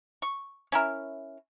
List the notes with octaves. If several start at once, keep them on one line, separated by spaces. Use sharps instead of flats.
C#6
C#4 E4 A#4